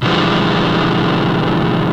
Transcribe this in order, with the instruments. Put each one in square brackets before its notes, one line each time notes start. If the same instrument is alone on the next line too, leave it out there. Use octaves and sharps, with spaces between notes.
[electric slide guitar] B2 D3 E3 F3 G3 G#3